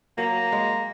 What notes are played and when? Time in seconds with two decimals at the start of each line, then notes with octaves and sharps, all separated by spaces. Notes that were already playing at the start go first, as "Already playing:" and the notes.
0.18 F#3 A#3
0.52 G#3